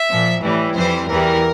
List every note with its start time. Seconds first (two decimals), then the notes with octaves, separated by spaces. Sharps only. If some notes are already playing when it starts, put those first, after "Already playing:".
Already playing: E5
0.09 A#2 F3
0.43 A2 E3 G3
0.75 F2 E3 G3 C5
1.08 E2 E3 G3 A#4